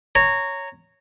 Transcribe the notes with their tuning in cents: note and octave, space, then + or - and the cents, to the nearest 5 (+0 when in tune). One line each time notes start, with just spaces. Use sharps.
C#5 +0 A#5 -15